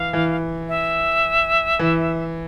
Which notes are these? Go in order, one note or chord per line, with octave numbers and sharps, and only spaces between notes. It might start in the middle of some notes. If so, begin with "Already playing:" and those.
Already playing: E3 F5
E3
E5
E3